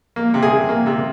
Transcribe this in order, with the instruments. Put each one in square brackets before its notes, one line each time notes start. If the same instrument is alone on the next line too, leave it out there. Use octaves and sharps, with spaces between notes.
[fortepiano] A#3
C3
G#4
C3
A#3
C3